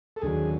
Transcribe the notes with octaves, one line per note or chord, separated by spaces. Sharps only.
A4
D#2 D3 F#3 G#4